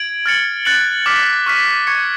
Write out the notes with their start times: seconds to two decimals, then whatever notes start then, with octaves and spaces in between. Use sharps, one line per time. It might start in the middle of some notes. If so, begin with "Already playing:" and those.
Already playing: G#6 D7 F#7
0.26 F6 A6 C#7 F#7
0.65 F#6 A6 C#7 F#7
1.06 D6 F6 B6
1.46 C#6 F6 B6
1.87 C#6 G#6 C#7